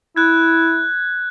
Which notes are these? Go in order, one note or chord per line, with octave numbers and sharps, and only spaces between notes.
E4 F#6 G#6